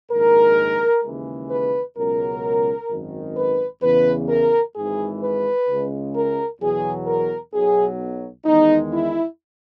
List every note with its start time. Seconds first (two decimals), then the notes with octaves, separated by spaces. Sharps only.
0.12 A#1 G#2 D#3 G#3 A#4
1.04 D#2 C#3 E3 G#3
1.50 B4
1.98 C#2 B2 F#3 A#4
2.90 G#1 F#2 D#3
3.36 B4
3.82 E2 C#3 E3 B4
4.29 A#4
4.75 G#1 G#2 E3 G#3 G#4
5.22 B4
5.69 C#2 C#3 G#3
6.15 A#4
6.60 E2 B2 F#3 G#4
7.07 A#4
7.54 B1 B2 F#3 G#4
8.46 E2 D#3 G#3 D#4
8.93 E4